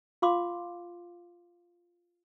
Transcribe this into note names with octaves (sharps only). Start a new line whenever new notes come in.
F4 F5 C6 D6